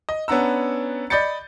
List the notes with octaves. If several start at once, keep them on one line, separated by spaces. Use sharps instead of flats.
D#5
B3 C#4 D4 F#5 A#5 E6
D5 D#5 B5 G6 A6 C#7